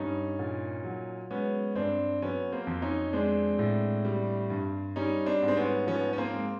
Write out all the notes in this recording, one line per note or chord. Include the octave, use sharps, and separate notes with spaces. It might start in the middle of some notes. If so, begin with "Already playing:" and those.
Already playing: G2 G3 C#4 D#4
A#2
F#3
G#3 B3 C#4
G2 C4 D4
F#3 B3 C#4
A#3 C4
F2
C#4 D#4
G#3 C4 D4
A2
G3
G2
G3 C#4 D#4
C4 D4
G#2
C4
B3 C#4
F3 B3 C#4
C#4
A#3 C4
G#3